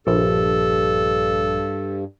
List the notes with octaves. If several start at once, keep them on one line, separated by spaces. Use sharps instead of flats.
A#1 G2 A4